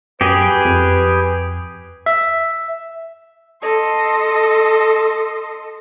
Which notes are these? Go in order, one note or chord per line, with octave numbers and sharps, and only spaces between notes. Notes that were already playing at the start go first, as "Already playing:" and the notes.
F#2 G4 G#4 B4
F2
E5
A4 D#5 C6